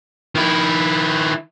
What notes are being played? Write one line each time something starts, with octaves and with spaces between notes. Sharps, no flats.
D#3 E4